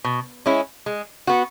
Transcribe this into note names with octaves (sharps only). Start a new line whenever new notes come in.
B2
G#3 C#4 E4
G#3
B3 F#4